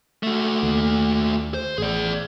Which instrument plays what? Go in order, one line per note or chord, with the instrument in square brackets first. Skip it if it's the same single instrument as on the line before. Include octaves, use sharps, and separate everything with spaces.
[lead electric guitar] A3 F#4
[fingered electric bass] D#2
[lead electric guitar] C5
[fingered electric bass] A1 [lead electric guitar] G#4 D5